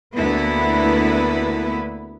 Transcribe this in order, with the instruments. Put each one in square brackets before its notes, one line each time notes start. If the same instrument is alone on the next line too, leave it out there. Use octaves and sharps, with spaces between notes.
[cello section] D2 A#3 B3 E4 B4